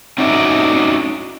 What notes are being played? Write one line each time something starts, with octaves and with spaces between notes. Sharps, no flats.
C#4 D#4 E4 F#4 D5 E5